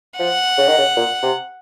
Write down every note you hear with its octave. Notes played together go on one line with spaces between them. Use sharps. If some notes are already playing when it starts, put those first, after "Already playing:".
F3 F#5
C#3
D#3
C#3
A#2
C3